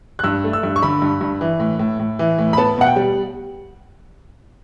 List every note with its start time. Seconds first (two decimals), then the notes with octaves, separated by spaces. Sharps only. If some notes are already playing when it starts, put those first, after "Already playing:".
0.19 F#6
0.24 G2 E6
0.44 A3
0.53 E6
0.63 G2
0.76 C#6
0.82 D3 B5
1.02 G2
1.21 G2
1.41 E3
1.60 A2
1.79 A2
2.00 A2
2.19 E3
2.39 A2
2.53 B5
2.57 B3 A5
2.78 B2 F#5
2.86 G5
2.96 G3